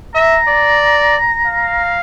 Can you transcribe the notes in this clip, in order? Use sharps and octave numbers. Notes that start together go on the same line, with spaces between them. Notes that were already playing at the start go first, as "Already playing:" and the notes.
E5 A#5
D5
F5